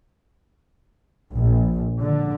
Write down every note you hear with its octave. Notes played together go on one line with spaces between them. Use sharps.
A#1
D3